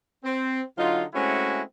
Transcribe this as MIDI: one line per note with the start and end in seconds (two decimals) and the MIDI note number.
0.24 0.61 60
0.77 1.03 50
0.77 1.03 54
0.77 1.03 63
0.77 1.03 65
1.14 1.62 56
1.14 1.62 57
1.14 1.62 60
1.14 1.62 61
1.14 1.62 64
1.14 1.62 66